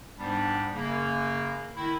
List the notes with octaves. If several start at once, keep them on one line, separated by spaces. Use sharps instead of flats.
G#2 G3 B3 D4
F#2 C#3 A#3
D#3 E4